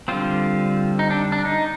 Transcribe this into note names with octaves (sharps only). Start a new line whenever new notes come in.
D3 G3 C4 F4
D#4
D4
D4
D#4